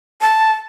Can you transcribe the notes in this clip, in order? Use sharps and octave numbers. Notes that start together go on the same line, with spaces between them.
A5